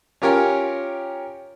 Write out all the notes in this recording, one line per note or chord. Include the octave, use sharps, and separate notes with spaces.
C#4 F4 G4 A#4 C#5 G#5